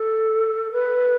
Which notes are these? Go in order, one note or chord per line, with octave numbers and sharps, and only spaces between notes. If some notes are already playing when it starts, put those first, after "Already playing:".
Already playing: A4
B4